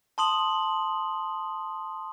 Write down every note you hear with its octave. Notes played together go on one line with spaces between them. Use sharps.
A5 C6 D#6 F#7